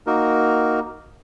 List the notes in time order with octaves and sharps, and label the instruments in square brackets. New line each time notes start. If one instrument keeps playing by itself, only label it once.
[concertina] A#3 D#4 F#4 A#4